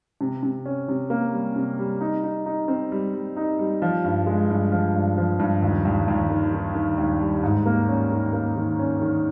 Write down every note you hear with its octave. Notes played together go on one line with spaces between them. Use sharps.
C3
C3
C#4
C3
A#3
G3
C3
G3
D#4
D#4
D#4
C4
G3
G3
D#4
G3
F3
G2
G#3
G2
F3
G2
F3
G2
D#2
D#2
D#2
D#3
D#3
D#3
D#2
G3
G#2
A#3
C#4
D#3
A#3
D#3
C#4
D#3